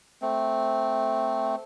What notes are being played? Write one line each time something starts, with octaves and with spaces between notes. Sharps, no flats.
A3 C4